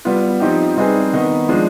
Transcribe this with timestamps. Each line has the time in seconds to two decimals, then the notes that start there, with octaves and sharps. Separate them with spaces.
0.05 G3 B3 F4
0.40 F3 C4 D#4 G4
0.77 G3 C4 D#4 G#4 B4
1.13 D#3 B3 D#4
1.49 F3 G#3 D4